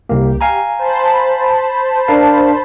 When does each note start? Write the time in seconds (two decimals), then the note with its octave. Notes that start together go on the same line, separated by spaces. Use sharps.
0.09 C2 A#3 G4
0.41 F5 G#5 A#5
0.79 C5 A5 B5
2.08 D4 A#4 F5